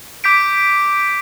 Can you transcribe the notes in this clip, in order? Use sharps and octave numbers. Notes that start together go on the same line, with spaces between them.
D6 G6 B6 D7